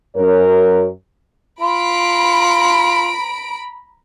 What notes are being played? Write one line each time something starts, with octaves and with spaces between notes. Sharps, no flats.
F#2 A#4 C#5
F4 A#5 B5 D7